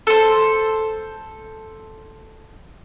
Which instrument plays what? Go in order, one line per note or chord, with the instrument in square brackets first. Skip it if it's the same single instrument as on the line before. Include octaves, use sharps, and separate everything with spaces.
[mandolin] A4 C5